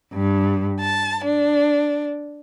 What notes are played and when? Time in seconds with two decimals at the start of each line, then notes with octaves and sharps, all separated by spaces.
0.12 G2
0.80 A5
1.23 D4